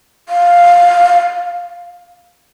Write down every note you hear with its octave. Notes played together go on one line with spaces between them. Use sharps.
F5